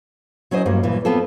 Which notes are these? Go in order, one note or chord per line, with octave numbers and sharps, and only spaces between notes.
F#3 C#4 E4 C5 D#5
G2 F#3 A#3
D#2 A#2 E3
B3 C4 F4 A4